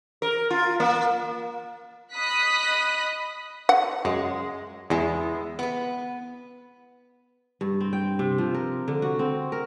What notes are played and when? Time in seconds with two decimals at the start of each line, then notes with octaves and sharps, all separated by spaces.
0.22 A#4
0.50 F4
0.80 A#3
2.15 D#5 B5 D#6 F#6 B6
3.69 F#5
4.05 F#2 G#3
4.90 E2 G#3 B3 E4
5.59 B3 B4
7.61 G2
7.80 C4
7.93 G5
8.19 C3
8.38 F3
8.54 A#4
8.88 D3
9.02 F#4
9.19 C4
9.52 A#4